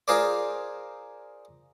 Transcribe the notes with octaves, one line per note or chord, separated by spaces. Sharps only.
F4 G#4 A#4 C5 D5